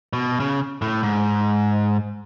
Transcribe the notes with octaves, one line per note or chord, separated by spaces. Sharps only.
B2
C#3
A2
G#2